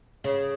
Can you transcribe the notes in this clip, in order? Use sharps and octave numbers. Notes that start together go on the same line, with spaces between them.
C#3